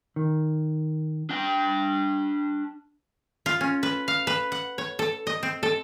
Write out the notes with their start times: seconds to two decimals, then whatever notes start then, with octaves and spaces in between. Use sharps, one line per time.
0.16 D#3
1.29 D4 G5
3.46 F4
3.61 C#4
3.83 B4
4.08 F5
4.27 B4
4.52 F#5
4.78 C#5
4.99 A4
5.27 D#5
5.43 C4
5.63 A4